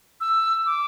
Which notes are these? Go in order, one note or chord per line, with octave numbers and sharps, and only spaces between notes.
E6
D6